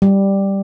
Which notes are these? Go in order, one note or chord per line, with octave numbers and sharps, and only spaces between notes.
G3